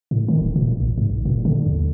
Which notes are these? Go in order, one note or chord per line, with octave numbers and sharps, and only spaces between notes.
A2
D#3
D#1
A#2
A1
G#2
G1
A#2
D3
D#2